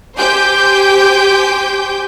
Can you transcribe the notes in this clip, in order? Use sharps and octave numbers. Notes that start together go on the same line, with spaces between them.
G4 C5 G5 G#5 D6 G6